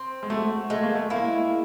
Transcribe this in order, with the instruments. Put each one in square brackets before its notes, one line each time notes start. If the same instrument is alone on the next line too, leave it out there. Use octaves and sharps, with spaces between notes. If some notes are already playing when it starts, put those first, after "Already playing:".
Already playing: [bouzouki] C4
[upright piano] G#3
[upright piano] A3 [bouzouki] F#4
[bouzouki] G#3 [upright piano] A3
[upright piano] A#3
A3
[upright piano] A#3 [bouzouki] E4